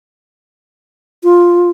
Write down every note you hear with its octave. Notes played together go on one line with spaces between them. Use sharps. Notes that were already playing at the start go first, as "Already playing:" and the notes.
F4